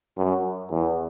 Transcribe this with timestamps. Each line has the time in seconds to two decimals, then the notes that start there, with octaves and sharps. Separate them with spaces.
0.18 F#2
0.71 E2